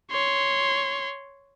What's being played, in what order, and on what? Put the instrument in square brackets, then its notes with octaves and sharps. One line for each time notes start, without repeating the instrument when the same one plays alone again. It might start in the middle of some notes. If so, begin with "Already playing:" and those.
[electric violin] C#5 C6